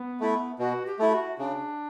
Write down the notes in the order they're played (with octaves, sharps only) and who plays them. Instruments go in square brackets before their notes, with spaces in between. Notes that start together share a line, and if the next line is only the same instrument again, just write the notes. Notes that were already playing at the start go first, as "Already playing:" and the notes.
Already playing: [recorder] B3
[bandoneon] A3 E4
[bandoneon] B2 [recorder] F#4
[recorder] G4
[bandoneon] A3 E4
[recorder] F#4
[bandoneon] C#3 [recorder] D4